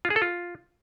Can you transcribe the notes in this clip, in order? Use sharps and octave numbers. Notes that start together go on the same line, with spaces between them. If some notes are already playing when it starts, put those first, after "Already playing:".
F4
G#4
A4
F4